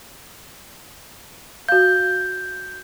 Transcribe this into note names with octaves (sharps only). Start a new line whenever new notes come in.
F#4 F5 G6